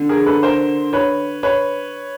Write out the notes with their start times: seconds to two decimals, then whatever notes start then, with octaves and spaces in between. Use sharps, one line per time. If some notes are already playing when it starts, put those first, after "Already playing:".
Already playing: D3
0.09 G#4 A#4
0.26 A4 B4
0.43 A#4 C5
0.93 B4 C#5
1.43 B4 C#5